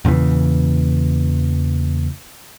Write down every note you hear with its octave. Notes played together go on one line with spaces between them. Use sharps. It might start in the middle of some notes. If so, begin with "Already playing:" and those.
E2 A#2 C#3 E3